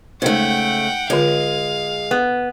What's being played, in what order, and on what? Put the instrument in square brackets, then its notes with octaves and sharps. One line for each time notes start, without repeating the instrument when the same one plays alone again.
[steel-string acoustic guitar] C#3 A3 [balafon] G#3 D#4 C5 [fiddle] F#5 G5
[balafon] D3 F4 C#5 [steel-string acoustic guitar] G#3 [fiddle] F5
[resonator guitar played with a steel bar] B3